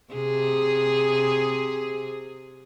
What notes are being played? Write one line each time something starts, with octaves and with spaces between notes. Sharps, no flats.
C3 G#4